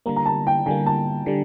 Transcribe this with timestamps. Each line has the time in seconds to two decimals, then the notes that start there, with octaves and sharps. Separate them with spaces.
0.06 D3 G3 A#3 A#5
0.16 A#5
0.26 A5
0.47 G5
0.66 D3 G3 A#3 G#5
0.86 A5
1.26 D3 G3